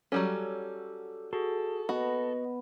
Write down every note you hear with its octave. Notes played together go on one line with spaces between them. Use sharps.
F#3 G3 C#4 A4 F#5 D6
F#4 G#4 A4
B3 F#4 D#5